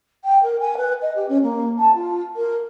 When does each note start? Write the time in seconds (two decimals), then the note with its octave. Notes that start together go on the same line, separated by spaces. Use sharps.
0.24 G5
0.43 A#4
0.60 G#5
0.77 B4
1.02 D#5
1.16 G4
1.28 C#4
1.43 A#3
1.78 A5
1.94 F4
2.36 A#4